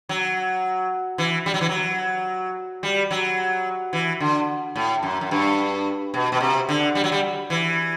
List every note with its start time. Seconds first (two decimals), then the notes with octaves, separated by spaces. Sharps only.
0.09 F#3
1.18 E3
1.46 G3
1.54 F#3
1.61 E3
1.69 F#3
2.83 G3
3.11 F#3
3.93 E3
4.20 D3
4.76 A2
5.03 F#2
5.21 F#2
5.31 G2
6.14 B2
6.32 B2
6.40 C3
6.69 D3
6.95 G3
7.04 F#3
7.12 G3
7.50 E3